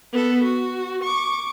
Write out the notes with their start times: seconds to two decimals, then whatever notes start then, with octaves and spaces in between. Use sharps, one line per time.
0.12 B3 A4
0.43 F#4
1.03 C#6 D6